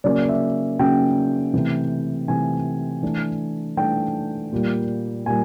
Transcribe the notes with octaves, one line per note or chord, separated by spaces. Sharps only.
C#3 F#3 A#3 C#4 D5
E5
C#3 F#3 A#3 C#4 G5
C3 E3 A3
C3 E3 A3 G#5
E3 A3 D4
E3 A3 D4 G5
A#2 G3 A#3
A#2 G3 A#3 G#5